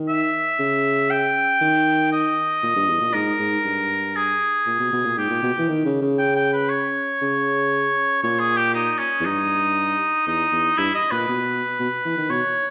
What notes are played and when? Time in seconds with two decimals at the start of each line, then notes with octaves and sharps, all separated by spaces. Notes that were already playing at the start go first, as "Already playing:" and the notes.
Already playing: D#3
0.09 E5
0.59 C#3
1.11 G5
1.61 D#3
2.13 D#5
2.63 A#2
2.76 G2
2.88 E2
3.01 A#2
3.14 G#2 A#4
3.39 G#2
3.65 G2
4.16 G#4
4.66 A#2
4.79 B2
4.93 B2
5.05 A#2
5.17 G#2 G4
5.30 A#2
5.43 B2
5.59 E3
5.69 D#3
5.85 C#3
6.02 C#3
6.19 G5
6.36 G5
6.54 B4
6.70 C#5
7.22 C#3
8.23 A#2 C#5
8.40 G#4
8.57 G4
8.75 D#4
8.99 C#4
9.20 E2
9.25 G2 D#4
10.27 E2 D#4
10.52 E2
10.77 G2 E4
10.95 D#5
11.11 A#2 B4
11.28 B2
11.80 B2
12.05 E3
12.18 D#3
12.30 B2 C#5